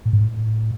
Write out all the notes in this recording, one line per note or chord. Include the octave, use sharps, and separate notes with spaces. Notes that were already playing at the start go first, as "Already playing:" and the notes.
A2
G#2
A2